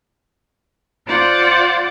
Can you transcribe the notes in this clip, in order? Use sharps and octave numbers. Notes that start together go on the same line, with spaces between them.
F4 C5 D5 F#5